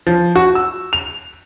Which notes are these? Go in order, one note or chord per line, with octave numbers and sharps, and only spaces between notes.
F3
F#4
E6
F7